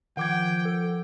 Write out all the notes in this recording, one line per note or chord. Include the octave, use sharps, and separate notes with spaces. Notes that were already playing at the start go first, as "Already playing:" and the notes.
D#3 F3 F#5 G5 D6 G#6
A4